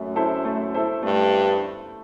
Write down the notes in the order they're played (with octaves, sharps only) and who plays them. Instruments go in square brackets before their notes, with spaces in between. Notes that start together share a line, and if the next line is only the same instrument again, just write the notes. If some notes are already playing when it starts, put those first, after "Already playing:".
Already playing: [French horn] F#2 [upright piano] A3 E5
[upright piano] E4 A4 C5 E5
A3
E4 A4 C5 E5
[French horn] G2 [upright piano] A3